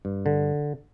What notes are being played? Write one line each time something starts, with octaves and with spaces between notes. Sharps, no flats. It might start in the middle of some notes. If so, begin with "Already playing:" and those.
G2
D3